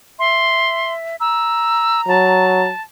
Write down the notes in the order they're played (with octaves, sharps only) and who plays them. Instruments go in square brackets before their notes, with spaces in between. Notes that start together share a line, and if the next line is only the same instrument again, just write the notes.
[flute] E5 [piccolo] C6
[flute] A#5 [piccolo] E6
[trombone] F#3 [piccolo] A5